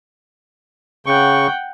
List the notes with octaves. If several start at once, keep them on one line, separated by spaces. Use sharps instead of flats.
C#3 F#5 G5 C#6